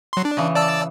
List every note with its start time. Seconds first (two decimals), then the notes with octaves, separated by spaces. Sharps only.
0.13 F#3 C6
0.25 D4
0.37 C#3 E3
0.55 D5 A5 E6